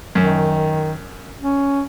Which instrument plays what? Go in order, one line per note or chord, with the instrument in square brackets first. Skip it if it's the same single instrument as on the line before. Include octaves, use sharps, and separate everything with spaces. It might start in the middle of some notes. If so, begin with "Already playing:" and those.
[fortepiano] F#2 [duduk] D#3
[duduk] C#4